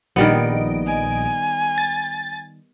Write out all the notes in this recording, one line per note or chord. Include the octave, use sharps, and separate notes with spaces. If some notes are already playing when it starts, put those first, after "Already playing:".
A#1 D#3 G3 B3 D#5 D7
G#5
A6